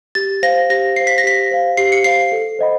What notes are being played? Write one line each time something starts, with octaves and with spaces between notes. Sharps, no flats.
G4 A6
C5 F5 A#6
G4 A#6
C5 F5 C7
B6
A#6
G4 B6
C5 F5
G4 C7
C#7
C5 F5 C7
A4
C5 D#5 F#5 B5